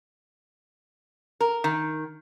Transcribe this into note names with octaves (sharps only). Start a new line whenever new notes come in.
A#4
D#3